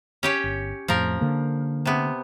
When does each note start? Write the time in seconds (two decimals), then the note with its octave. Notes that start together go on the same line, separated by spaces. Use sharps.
0.23 C#4 G4 C#5
0.44 G1
0.88 F2 A2 F3 A#4
1.21 D3 A#3
1.85 C3 B3